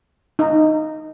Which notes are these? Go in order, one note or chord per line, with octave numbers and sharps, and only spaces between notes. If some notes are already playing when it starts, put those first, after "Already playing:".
D#4